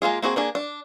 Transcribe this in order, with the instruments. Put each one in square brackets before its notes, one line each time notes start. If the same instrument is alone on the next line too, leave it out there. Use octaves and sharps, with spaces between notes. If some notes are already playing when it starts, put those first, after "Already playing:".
[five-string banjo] G#3 A#3 F4 G#4
A#3 C4 F#4 G#4
A#3 D4 G#4
D4